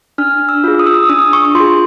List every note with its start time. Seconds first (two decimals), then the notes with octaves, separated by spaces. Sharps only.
0.18 D4 F6
0.49 E6
0.64 F4 G#4
0.79 D#6
0.86 E6
0.94 D#6
1.09 D4 D#6
1.33 C#6
1.45 C#6
1.55 F4 C6
1.60 G#4